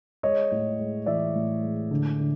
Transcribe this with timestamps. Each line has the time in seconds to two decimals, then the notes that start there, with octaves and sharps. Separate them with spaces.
0.23 G#3 C#5 D#5
0.52 A2
0.79 G#3
1.06 E3 D5 E5
1.35 A2
1.63 G#3
1.91 D3
2.19 D3